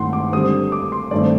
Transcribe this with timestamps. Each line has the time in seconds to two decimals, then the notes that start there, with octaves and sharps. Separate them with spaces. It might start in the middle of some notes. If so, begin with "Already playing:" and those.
Already playing: G2 D#3 A3 C4 F#5 C6
0.13 D6
0.33 D3 G3 C4 D#6
0.72 D6
0.92 C6
1.11 G2 D#3 A3 C4 D5